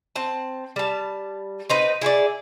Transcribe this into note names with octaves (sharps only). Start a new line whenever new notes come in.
C4 A5
G3 A5
C4 D#4 B4
E4 G#4 C5 D5